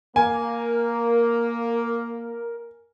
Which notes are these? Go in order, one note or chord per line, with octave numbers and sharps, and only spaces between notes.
A#3 A#4 G#5